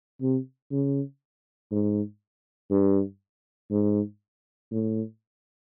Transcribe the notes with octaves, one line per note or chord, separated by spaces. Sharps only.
C3
C#3
G#2
G2
G#2
A2